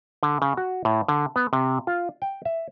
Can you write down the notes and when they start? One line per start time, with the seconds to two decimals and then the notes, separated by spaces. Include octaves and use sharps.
0.23 D3
0.42 C#3
0.57 F#4
0.85 A2
1.08 D3
1.36 B3
1.53 C3
1.87 F4
2.22 G5
2.45 E5